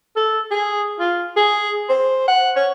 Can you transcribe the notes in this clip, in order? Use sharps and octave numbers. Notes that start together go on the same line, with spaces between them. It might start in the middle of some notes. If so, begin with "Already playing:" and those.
A4
G#4
F4
G#4
C5
F#5
C#5